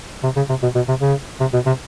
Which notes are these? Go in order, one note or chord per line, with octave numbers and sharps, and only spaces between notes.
C3
C#3
C3
B2
B2
C3
C#3
C3
B2
C3